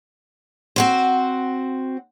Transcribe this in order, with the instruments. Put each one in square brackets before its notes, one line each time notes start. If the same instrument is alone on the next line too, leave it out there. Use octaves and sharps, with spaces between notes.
[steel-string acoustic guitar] C4 F#4 C5